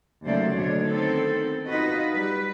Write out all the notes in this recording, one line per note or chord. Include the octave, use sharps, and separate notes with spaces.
D#2 C#3 F#3 A3 C5 D5
D2 B2 D4 C#5
D#3 B3 C4 A4
D#4 F4 F#4 B4 D#5
G3 B4